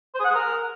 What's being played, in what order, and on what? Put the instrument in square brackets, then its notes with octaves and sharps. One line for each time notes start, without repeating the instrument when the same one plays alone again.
[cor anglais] C5
G#4
F#5
G#4
A#4